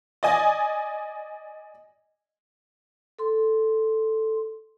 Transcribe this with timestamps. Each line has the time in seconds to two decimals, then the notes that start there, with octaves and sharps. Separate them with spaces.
0.23 D5 D#5 G#5
3.19 A4 C6